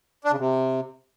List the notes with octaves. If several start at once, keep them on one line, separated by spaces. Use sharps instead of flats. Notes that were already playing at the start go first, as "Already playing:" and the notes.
D4
C#3
C3